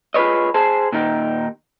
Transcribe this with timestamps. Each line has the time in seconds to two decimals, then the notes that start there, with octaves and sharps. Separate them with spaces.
0.14 F4 G#4 B4 C#5 D#5
0.54 G#4 C5 A5
0.92 A#2 D#3 D#4 G4